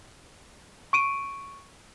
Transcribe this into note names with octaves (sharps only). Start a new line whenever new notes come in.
C#6 D7 D#7